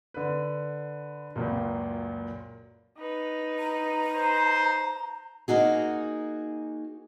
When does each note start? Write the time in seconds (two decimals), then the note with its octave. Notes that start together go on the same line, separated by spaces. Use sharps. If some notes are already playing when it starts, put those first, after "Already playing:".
0.14 D3 B4
1.36 C#2 F#2 A#2
2.98 D#4 B4
3.59 A#5
4.16 C5
5.48 A#3 D#4 F#4 G#4